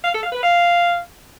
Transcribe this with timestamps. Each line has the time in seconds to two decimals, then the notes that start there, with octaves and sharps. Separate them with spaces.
0.04 F5
0.13 A4
0.23 F5
0.33 B4
0.42 F5